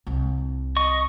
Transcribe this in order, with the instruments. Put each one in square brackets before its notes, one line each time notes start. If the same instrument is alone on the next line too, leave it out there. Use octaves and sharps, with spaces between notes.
[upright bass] C2
[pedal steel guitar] D#5 C#6